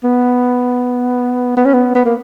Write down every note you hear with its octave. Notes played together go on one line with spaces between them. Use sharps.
B3
B3
C#4
B3
B3
A#3